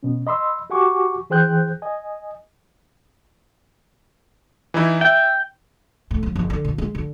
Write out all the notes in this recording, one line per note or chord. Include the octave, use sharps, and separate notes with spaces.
B2 C#4
D#5 B5 C6 E6
F#4 G4 F#5 G#5 C#6 D6
E3 G#4 C5 G5 F#6 G6
D#5 G#5
E3 D#4 E4
E5 G5
A2
F3
F#1
D3
A#2
G#3
D3